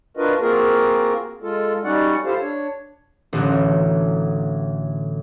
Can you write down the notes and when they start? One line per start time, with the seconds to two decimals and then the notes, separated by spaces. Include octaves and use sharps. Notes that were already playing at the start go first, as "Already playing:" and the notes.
0.17 D4 F4 F#4 A#4 B4 D#5
0.40 A#3 C4 F4 F#4 G#4 A#4
1.42 G#3 F4 A4
1.84 G3 C#4 D#4 F#4 D5 F#5
2.25 E4 F4 G4 A4 C5 F5
2.40 D4 C#5
3.33 A1 D3 F#3